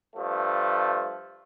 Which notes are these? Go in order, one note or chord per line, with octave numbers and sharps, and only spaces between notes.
G2 F3 A3